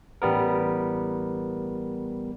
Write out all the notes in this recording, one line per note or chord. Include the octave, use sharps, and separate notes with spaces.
A1 G3 B3 A#4